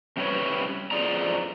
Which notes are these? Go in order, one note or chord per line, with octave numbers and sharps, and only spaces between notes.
C3 G3 C4 C#4 B4 C#5
F2 F4 G#4 D5 A#5